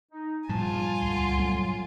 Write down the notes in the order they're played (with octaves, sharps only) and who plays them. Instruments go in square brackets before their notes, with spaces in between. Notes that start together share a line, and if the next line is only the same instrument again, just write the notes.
[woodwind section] D#4
[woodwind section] E2 A5 [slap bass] G2 A#2 F3 [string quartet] F4 G#5
[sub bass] C#2 [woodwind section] D3 C6
[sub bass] F#3